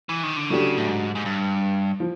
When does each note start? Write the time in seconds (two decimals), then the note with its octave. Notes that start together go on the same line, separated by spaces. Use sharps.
0.09 E3
0.23 D#3
0.36 D3
0.50 C#3 F#3 A3 D4 G4
0.77 A2
0.87 G#2
1.15 G#2
1.25 G2
2.00 F3